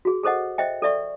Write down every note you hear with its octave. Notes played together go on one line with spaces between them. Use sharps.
F#4 G#4
G#4 A4 C5 D#5 F#5
C5 D#5 E5 G5
A4 D5 E5 C#6